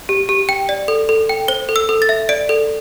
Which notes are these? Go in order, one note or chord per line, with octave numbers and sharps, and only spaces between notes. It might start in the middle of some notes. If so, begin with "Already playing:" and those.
G4
G4
G5
D5
A4
A4
G5
C5 G7
A4
E6
A4
A6
E5
D5 D7
A4